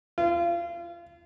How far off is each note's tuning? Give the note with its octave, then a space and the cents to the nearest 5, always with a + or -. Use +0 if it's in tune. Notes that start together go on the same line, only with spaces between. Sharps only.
F4 -30